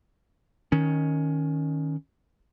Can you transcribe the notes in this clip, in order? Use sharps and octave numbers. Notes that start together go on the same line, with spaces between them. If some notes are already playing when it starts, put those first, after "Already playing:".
D#3 C#4